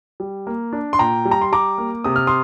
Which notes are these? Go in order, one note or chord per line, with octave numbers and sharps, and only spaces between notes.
G3
A#3
D4
C6
A#2 G5 A#5
G3
A#5
C6
G3 A#5 D6
A#3
C3 D#6
F6
C6 D#6